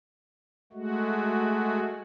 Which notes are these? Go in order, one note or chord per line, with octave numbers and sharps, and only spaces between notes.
G#3 A3 F#4